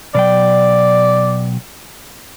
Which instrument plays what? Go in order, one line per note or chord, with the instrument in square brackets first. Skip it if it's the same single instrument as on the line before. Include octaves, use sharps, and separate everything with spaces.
[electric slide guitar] B2 F#3 G5 [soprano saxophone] D5